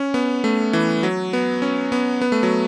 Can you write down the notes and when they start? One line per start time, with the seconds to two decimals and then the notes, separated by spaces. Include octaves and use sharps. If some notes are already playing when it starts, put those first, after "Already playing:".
Already playing: C#4
0.14 B3
0.44 A3
0.73 E3
1.03 F#3
1.33 B3
1.62 C#4
1.92 B3
2.21 B3
2.32 A3
2.43 F#3